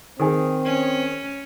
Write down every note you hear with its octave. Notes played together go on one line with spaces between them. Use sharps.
D#3 C4 G#4
C#4